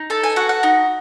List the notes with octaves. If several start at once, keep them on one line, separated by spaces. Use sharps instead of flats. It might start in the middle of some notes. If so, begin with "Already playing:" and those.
Already playing: D#4
A4 A5
G#5
F#4 F#5
F#5
D#4